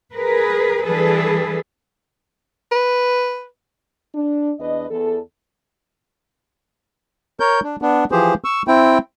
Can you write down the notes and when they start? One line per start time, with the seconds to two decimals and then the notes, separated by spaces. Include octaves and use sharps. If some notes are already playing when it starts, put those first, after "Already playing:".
0.13 G#4 A#4 B4
0.85 E3 G3 D4 G#4 A4 B4
2.71 B4
4.15 D4
4.59 E2 D4 B4 D#5
4.90 E2 A4
7.40 A#4 C#5 G6
7.64 D4
7.82 B3 D4
8.12 E3 F3 G4 G#4 C5
8.44 C#6 E6
8.68 C4 E4 G5